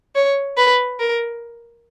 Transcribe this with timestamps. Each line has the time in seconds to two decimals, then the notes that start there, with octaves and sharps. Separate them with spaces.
0.15 C#5
0.57 B4
0.99 A#4